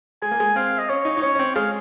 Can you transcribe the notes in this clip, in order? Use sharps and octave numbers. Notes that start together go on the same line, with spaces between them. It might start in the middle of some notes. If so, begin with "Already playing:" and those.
G#3 G#5
A#3
G#3
C4 F5
D#5
C#4 C#5
D#4
D#4
C#4 C#5
C#4
C4
G#3 F5